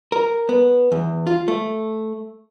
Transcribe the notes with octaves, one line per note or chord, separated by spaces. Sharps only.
A#4
B3
E2
F4
A3